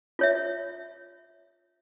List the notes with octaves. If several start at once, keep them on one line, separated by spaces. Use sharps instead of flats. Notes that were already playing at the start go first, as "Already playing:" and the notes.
F4 C#5 E5